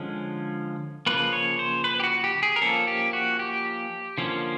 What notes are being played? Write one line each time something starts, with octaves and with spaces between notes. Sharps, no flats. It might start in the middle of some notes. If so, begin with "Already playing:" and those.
Already playing: D3 F3 G#3 C#4
C#3 F3 A#3 B4
C#5
C5
B4
G4
F#4
G4
G#4
A#4
F3 A#3 C#4 A4
G4
F#4
G4
D3 F3 A#3 C#4